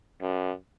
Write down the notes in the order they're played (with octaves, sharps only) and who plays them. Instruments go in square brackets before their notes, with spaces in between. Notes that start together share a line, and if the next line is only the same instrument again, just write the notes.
[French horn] F#2